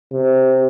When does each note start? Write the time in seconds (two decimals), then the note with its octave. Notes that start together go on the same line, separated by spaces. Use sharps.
0.13 C3